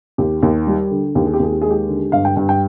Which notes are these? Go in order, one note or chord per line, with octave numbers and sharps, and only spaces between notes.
D#2 G4
D#2
G3
D3
D#2 G4
G#4
G4
D#2 G#4
G4
G#3 G#4
G4
D3
G2 F5
G5
G2 G5
G5